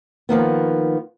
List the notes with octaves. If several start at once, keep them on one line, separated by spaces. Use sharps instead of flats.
D#3 F3 A#3 B3